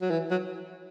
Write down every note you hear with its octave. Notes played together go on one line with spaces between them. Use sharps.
F#3
E3
F#3